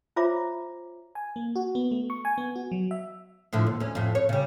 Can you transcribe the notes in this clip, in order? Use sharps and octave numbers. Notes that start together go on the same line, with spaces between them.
F4 C5 C#5 E5 A#5 D6
G#5
A#3
F#4
B3
A3
C#6
G#5
B3
F#4
F#3
E5
A2 D3 F3
D#2
D2 C#4
F2 A2
C#5
C#3 G3